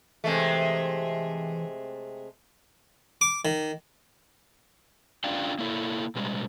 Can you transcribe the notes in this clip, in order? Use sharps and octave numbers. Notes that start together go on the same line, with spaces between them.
C3 E3 G#3 A3
D6
D#3
C#4 D4 F4 D5 F5 G5
A#3 E4 A4
B2 G3 G#3